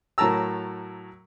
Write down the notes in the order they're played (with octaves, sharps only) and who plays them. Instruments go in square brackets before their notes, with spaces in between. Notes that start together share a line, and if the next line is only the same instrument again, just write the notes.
[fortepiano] A2 F#3 A#4 A5 A#5 E6